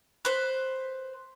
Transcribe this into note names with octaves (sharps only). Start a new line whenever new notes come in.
B4 C5